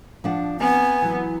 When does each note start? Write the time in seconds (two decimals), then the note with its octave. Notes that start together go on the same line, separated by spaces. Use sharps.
0.24 F3 D4 F#5
0.60 B3 C4 G#5
1.02 E3 F#3